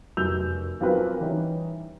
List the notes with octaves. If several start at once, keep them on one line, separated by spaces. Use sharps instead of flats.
F1 F#2 E6 G6 F7
B1 F3 C4 F#4 A#4 B4
E3 G3 C#4 D#4